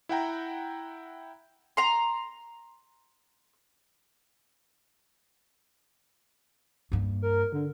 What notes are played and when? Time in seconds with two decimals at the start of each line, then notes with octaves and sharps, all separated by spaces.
0.09 E4 F#5 G5 A#5
1.77 A#5 C6
6.92 G2 A#3
7.22 A#4
7.52 D3